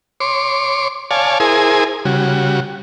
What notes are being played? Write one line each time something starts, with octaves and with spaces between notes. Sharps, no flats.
C#5 C6 D6
C#5 D5 F5 G#5 A5
E4 G#4 A#4 C5 G#5 D#6
C#3 G3 F#4